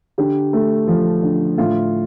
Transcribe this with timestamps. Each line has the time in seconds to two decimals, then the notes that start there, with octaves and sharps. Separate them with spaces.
0.18 D3 G4
0.53 A3
0.87 F3
1.23 D3
1.58 A2 F4